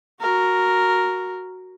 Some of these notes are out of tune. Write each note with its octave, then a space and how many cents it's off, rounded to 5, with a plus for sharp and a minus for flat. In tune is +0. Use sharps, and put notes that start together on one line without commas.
F#4 +0 A#4 +0